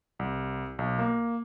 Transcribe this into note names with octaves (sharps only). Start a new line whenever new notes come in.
C2
B1
A#3